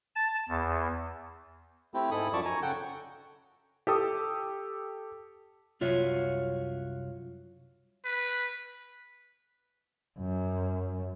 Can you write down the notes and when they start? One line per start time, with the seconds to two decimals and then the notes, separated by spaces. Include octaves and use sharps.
0.15 A5
0.49 E2
1.94 A3 C4 E4 G4
2.11 G#2 G#3 E4 A4 B5 D#6
2.33 F#2 F3 D5 A5 C#6
2.45 G#5 A#5 C#6
2.62 C#3 A4 F#5 G5 G6
3.87 G4 A4 D#6
5.81 C2 F#2 F4 F#4 C#5 E5
8.05 B4
10.20 F#2